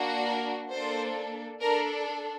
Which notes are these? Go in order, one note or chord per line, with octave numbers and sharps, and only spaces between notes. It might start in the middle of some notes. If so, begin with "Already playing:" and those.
Already playing: A#3 D4 F#4
A#4
A#3 D4 A4 C5
D4 A4 A#4